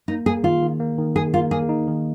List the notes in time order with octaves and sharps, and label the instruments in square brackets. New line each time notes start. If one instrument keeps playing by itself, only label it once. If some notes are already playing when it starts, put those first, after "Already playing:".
[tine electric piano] A#3 [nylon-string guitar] D#4
[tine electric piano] A#3 [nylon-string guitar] G#4
[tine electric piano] D#3 [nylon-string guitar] F4
[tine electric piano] D#3
A#3
D#3
[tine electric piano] D#3 [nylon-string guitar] G#4
[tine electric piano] A#3 [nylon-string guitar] F4
[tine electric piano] A#3 [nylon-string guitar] G#4
[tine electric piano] D#4
D#3